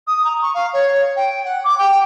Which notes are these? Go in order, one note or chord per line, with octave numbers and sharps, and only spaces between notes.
D#6
A#5
C#6
F5
C#5
G5
F#5
D6
G5